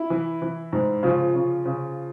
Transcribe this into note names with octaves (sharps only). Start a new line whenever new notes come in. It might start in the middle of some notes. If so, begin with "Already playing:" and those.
Already playing: E4
E3
E3
G#2
C#3 F3 F4
C#3
C#3